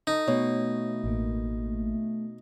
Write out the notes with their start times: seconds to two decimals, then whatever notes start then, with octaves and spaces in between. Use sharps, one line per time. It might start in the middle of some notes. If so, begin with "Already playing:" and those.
0.07 D#4 A4
0.28 B2 A3 C#5
1.04 A1 A#3